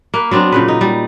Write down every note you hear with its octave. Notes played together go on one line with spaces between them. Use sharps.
A#3 B4
F#3 B3 C4 D4
A#2 C#3 B4
D#4
G3